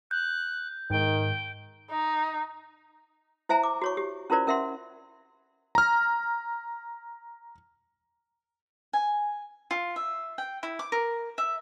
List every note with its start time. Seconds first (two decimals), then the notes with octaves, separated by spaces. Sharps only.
0.11 F#6 G6
0.90 G#2 D#3 G5
1.90 D#4
3.49 E4 C5 E5 G#5 A#5
3.64 D6
3.82 F#4 C#5 C#6
3.97 G4
4.30 C#4 E4 F4 A#4 C5 D5
4.47 C#4 A#4 E5 F#5 C6
5.75 A#5 F6
8.93 G#5
9.71 F4
9.96 E5
10.38 G5
10.63 E4
10.79 D6
10.92 A#4
11.38 E5